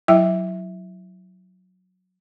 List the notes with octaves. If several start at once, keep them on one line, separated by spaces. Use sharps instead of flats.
F#3 E4 E5 G5